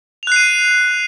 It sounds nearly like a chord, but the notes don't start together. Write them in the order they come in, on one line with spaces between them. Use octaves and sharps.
F7 F#6 C7 D#7